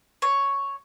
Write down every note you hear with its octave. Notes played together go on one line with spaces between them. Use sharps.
C#5